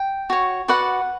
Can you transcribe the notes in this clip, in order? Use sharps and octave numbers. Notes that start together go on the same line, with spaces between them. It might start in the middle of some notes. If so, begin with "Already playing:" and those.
Already playing: G5
F#4 C#5
F#4 B4 D5 F#5